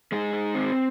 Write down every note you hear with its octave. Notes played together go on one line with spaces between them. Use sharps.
G#3 D#4 G#4
D#4
C4